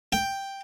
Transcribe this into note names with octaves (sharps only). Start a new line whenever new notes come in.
G5